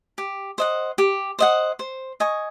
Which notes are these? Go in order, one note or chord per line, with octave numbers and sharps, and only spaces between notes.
G4
C5 D#5 F#5
G4
C5 D#5 F#5
C5
D#5 G#5 C#6